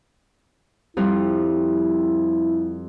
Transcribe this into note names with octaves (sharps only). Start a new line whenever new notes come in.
F2 F3 G3 E4